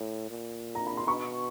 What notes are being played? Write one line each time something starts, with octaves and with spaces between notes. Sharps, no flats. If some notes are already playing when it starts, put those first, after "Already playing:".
Already playing: A2
A#2
A#5
B5
C6
B2 B5 C#6